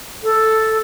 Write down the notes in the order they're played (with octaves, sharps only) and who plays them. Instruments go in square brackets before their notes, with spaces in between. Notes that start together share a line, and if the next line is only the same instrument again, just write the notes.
[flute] A4